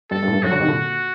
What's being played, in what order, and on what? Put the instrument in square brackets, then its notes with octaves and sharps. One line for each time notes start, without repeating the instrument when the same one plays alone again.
[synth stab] G2 [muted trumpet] A4
[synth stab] G2
A2
G2
[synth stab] F#2 A2 [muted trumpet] F#4
[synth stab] D3 F#3
C3 D#3
A#2 D3